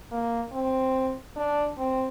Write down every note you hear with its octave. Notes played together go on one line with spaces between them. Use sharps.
A#3
C4
D4
C4